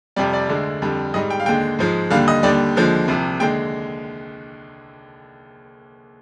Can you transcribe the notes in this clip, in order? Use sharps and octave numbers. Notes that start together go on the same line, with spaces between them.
F2 C3 G3 D5
D5
D2 D3 G#3
F2 D3 G3
G#2 G3 D#5
G5
F5
D#2 D3 G#3 G5
G#2 F3 G#3
D#2 D3 G3 F5
D#5
D#2 D3 G3 D5
D#2 D3 F3 G#3
C2 C3 F3
D#2 D3 G#3 G5